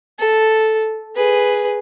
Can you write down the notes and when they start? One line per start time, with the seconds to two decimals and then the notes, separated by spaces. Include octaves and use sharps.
0.19 A4
1.16 G#4 B4